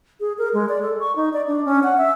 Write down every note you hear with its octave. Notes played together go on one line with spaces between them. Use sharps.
G#4
A#4
G#3
D5
A4
C#6
D#4
D5
D4
C#4
F#5
E5